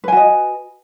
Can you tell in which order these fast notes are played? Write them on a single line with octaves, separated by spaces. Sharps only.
B4 G#5 F#4 D#5